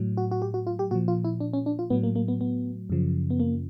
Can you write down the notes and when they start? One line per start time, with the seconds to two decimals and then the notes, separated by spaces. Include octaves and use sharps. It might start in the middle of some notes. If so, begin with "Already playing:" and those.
Already playing: A2 F#3
0.17 F#4
0.31 F#4
0.42 G4
0.54 F#4
0.67 F4
0.79 G4
0.91 A#2 F3 F#4
1.08 F4
1.25 E4
1.40 D4
1.53 C#4
1.66 D4
1.79 F4
1.90 A2 F#3 B3
2.03 A#3
2.16 A#3
2.28 B3
2.41 B3
2.90 F#2 C#3 F3
3.30 B3
3.40 A#3